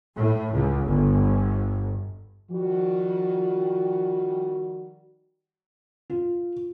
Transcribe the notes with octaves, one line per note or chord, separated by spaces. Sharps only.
A2
C#2
G1
D#3 F3 G3 F#4
F4